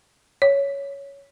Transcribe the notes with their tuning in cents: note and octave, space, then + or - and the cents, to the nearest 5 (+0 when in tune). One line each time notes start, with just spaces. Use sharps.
C#5 +10